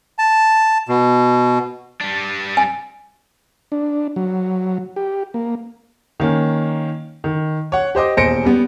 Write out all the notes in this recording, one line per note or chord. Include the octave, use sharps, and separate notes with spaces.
A5
B2
G3 D4
G#5
D4
F#3
G4
A#3
D#3 A#3 C#4
D#3
C#5 F#5
G4 C5 D#5 D6
D#1 E2 C5 A#6 C#7 D7
G3 B3